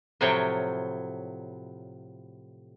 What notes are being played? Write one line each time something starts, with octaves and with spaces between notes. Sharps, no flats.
A2 C3 F3 F#3 C#5 G5